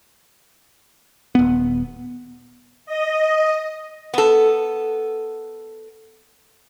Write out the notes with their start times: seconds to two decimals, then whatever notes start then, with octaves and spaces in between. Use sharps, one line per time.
1.35 D#1 B3
2.86 D#5
4.14 B3 A4